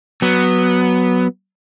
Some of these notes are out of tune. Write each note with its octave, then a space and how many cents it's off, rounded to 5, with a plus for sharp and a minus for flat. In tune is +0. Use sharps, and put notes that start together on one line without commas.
F#3 +0 B3 +0